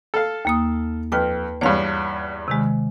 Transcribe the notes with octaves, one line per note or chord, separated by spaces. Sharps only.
A4 F5
D#2 A#3 D#6
F2 B4 G5 F6
E2 G2 C#5 F5
C3 D#3 G#3